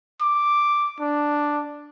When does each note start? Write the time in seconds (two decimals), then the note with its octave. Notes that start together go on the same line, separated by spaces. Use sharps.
0.21 D6
1.00 D4